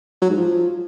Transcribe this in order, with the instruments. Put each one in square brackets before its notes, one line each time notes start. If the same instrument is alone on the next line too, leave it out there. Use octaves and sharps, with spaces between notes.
[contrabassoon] F#3
G#2
F3